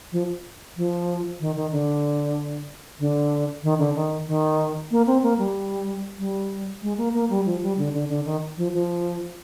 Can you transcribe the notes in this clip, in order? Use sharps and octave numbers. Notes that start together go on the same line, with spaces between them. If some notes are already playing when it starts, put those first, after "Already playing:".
F3
F3
D#3
D#3
D3
D3
D#3
D3
D#3
D#3
A#3
C4
A#3
G3
G3
G#3
A#3
A#3
G3
F3
G3
D3
D3
D3
D#3
F3
F3